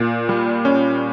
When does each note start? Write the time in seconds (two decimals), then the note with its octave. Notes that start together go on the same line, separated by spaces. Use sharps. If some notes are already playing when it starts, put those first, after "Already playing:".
Already playing: A#2
0.29 G3
0.65 C#4